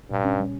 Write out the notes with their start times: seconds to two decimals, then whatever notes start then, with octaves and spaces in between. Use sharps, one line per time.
0.11 G2 A#2
0.25 C#4
0.40 G3